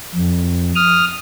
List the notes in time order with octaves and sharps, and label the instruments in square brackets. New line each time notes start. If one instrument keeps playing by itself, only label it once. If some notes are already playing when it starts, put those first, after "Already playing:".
[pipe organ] F2
D#6 F6